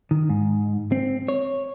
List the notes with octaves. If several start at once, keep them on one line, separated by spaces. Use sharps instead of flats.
D#3
G#2
C4
C#5